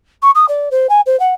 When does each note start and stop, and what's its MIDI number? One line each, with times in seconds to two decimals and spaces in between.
0.22 0.30 85
0.35 0.45 87
0.48 0.69 74
0.71 0.87 72
0.89 1.01 80
1.06 1.18 72
1.19 1.34 78